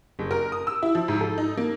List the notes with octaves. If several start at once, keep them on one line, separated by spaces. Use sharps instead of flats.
F#1
A#4
D#6
E6
E4
F3
G#2
A4
D#4
A#3